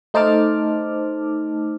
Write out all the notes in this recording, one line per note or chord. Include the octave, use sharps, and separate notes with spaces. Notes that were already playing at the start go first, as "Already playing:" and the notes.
A3 D#4 C5 A5 D6 F6